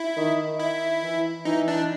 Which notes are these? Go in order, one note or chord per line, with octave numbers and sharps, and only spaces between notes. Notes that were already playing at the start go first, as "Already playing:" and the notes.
Already playing: E4
D#3
E4
E3
E3 D#4
D4